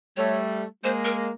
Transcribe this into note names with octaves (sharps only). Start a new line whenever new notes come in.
G3 A3 C#5
G#3 A#3 C5
A#4